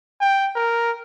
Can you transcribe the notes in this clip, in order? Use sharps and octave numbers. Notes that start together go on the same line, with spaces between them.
G5
A#4